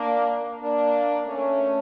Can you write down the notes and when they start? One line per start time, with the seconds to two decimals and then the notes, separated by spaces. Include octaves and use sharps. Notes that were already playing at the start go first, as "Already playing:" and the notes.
Already playing: A#3 D4
0.61 A#3 D4
1.26 A3 C#4